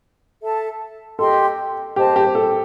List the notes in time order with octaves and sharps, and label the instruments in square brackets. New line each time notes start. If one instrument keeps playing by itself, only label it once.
[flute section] A4 E5 A5
[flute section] G4 D#5 G5 C6 [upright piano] A4
[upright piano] G4 [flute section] C5 D#5 A5
[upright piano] G4
A4